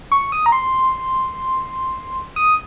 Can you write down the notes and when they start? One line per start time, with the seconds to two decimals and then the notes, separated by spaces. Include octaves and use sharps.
0.12 C#6
0.32 D#6
0.46 A#5
0.52 C6
2.36 D#6